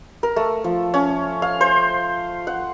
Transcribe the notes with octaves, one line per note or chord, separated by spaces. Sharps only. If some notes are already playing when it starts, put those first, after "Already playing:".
A#4
A3
F3
C#4
F5
C5
F#5